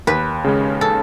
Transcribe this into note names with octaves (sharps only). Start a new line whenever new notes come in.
D#2 B4
C#3 G#3 C#4
A4